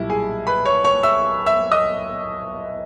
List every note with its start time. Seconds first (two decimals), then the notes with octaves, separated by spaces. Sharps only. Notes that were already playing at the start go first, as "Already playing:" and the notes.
Already playing: B1 A#2 G3 E4
0.10 G#4 G#5
0.47 B4 B5
0.65 C#5 C#6
0.84 C#5 C#6
1.03 E5 E6
1.46 E5 E6
1.71 D#5 D#6